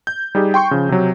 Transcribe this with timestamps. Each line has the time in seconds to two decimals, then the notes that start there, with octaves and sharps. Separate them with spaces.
0.07 G6
0.35 G3 D#4 G4 G#4
0.54 G5 C6 C#6 G6
0.71 C#3 F3
0.89 C3 F#3